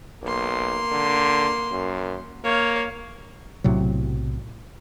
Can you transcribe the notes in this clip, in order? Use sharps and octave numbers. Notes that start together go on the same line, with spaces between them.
B1 A#3 C6
D3
F#2
A#3 C#5 F5
B1 A2 C3 F#3